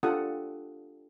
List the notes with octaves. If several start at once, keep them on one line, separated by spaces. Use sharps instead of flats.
D4 F4 G4 A4 F#5 D#6